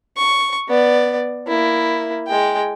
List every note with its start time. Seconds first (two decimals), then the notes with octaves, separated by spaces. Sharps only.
0.17 C#6
0.69 B3 D5
1.47 A#3 E4
2.28 G#3 G5